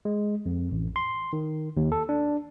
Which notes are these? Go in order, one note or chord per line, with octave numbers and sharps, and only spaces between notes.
G#3
F2
A1
C6
D#3
D#2
A4
D4